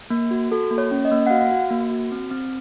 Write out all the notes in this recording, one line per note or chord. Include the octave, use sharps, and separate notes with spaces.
A#3
F#4
F#4 A4
A#3
C#5
C#4
D#5
A#3
F#5
F#4 F5
F#4
A#3
F#4
C4
C4